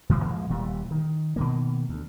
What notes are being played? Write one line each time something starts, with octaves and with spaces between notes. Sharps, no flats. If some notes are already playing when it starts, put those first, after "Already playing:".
F2 E3 G#3
A#2 E3 F3 G#3
D#1 A#2 E3 G3
D#3
B2 D#3 A#3
D2